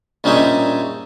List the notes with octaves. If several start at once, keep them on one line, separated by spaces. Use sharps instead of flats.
A#1 G3 C#4 D#4 E5 G#5